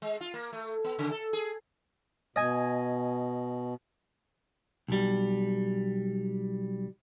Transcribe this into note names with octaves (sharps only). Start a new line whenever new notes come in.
G#3
F4
A#3
A3
B3
C#3
A4
G#4
B2 D#5 G#5
B1 G3